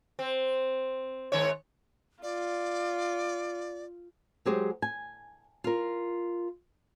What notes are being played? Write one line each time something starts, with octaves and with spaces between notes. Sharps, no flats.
C4
G#2 D#3 C#5
F4 D5
F#3 G#3 G4 G#4 C5
G#5
F4 A#4